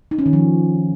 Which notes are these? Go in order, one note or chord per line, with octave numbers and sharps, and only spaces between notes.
D#4
C#4
D#3
F3